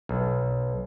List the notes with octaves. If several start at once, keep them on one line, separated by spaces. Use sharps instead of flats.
B1